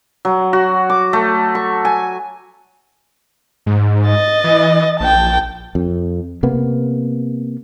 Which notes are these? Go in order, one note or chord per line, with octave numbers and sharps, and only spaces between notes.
F#3
F#4
D6
A3
C#6
G#5
G#2
D#5 A6
E3
A#1 G5 A5
F2
C3 A#3 B3